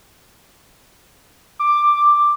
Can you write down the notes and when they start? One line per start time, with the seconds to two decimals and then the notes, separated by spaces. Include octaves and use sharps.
1.59 D6